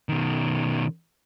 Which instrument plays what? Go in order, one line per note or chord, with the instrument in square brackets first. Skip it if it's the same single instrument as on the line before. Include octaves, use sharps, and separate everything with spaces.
[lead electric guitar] B2 D#3